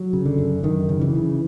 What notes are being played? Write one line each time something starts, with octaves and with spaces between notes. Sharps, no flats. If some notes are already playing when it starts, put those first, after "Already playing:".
Already playing: F#3
C#3
D3
F#2
F#2 D#3
C#3
E3
C#3